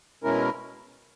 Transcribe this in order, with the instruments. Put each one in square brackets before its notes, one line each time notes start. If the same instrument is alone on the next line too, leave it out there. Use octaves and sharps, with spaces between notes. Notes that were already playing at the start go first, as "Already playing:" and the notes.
[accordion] B2 G#3 C#4 E4 A#4